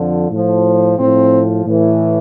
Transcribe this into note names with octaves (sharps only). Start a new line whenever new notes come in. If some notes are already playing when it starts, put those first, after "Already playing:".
Already playing: F2 D3 F3
A2 F3
A2 F3 C4
A2 E3